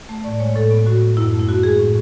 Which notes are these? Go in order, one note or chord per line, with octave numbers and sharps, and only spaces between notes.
A3
A2 D5
G#3 C#5
A2 A4
B3
A2 F#4
B3
F#2 E4
A3
E4
B3 F#4
G#3 G#4
A2